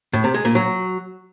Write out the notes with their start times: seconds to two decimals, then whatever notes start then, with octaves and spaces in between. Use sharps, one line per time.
0.13 A2
0.24 C3
0.34 G#3
0.45 A#2
0.55 F#3